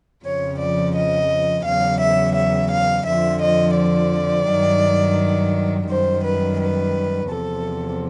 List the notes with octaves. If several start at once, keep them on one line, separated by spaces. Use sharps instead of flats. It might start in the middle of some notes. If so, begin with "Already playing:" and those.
F2 C#3 F3 C#5
D5
D#5
E2 C#3 F#3 F5
E5
E5
F5
F2 D3 F3 E5
D#5
D5
G2 D#3 F#3
F#2 D#3 G3 C5
B4
B4
E2 C3 F3 A4